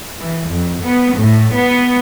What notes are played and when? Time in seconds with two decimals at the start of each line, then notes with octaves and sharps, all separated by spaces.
0.19 E3
0.50 F2
0.84 B3
1.20 A2
1.55 B3